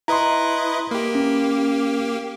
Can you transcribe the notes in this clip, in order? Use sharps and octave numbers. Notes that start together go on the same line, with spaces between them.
E4 B4 D#5 A#5 C6
A#3 G4
C#4